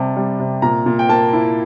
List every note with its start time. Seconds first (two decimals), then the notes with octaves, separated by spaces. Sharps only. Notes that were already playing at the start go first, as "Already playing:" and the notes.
Already playing: C3 G3 A5
0.16 G3
0.39 C3
0.62 A#2 A#5
0.86 A#2
0.99 G5
1.09 A#3 A5
1.33 E4